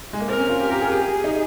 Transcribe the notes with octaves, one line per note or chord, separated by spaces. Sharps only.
G#3
A#3
C4 A#4
C#4
F4
G4
G4
G#4
G4 G#4
D#4